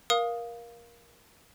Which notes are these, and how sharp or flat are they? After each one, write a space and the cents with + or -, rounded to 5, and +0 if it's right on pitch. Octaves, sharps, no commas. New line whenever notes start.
A#4 +20 F5 +0 D#6 +0